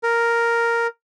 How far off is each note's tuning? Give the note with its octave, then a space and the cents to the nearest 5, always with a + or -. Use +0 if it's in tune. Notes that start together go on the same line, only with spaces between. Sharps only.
A#4 +0